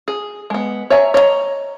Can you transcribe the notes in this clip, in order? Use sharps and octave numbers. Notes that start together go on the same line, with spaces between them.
G#4
G#3 B3
C#5 E5 G#5 A#5
C#5 D#5 E5 A#5